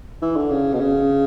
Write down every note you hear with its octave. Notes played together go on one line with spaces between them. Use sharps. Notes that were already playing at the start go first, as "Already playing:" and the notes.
E3
D3
C#3
B2
C#3